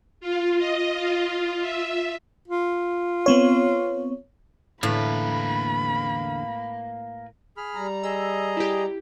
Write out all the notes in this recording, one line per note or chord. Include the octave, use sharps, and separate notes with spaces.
F4
D#5
F4
E5
F4
B3 C4 C#5
E2 A2 D3 A#3 B4 B5
G#4 B5 F6
G3 A#5
G#4 D#5 E6
E4 G4